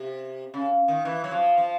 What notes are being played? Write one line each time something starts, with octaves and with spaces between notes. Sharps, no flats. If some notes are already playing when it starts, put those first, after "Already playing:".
Already playing: C3
C#3
D#3
E3
F#3
F3
F3